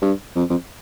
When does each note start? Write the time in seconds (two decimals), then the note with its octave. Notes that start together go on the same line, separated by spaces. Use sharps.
0.02 G2
0.36 F2
0.50 F2